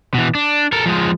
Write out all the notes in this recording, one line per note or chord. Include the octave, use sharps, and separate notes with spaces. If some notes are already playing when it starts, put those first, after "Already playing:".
B2 E3
D4
A4 A#4
F3 G#3